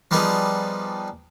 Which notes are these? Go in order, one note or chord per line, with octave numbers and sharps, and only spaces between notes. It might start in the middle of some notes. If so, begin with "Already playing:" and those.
F3 G3 B3 D#4 G#4